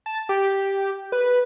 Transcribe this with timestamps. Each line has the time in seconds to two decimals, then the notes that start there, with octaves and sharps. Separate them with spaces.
0.06 A5
0.29 G4
1.12 B4